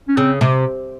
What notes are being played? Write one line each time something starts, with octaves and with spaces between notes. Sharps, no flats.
C#4
C#3 C4
C3